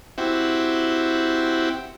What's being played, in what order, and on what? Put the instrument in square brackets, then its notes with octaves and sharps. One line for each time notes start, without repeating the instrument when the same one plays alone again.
[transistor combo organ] C4 E4 F#4 G4